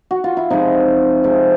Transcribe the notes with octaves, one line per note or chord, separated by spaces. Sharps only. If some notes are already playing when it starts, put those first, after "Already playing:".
F#4
F4
E4
C3 F3 G#3 D#4
C3 F3 G#3